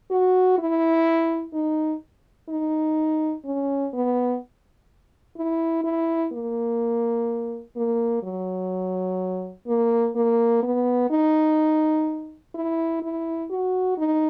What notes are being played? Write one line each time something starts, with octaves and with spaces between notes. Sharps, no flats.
F#4
E4
D#4
D#4
C#4
B3
E4
E4
A#3
A#3
F#3
A#3
A#3
B3
D#4
E4
E4
F#4
D#4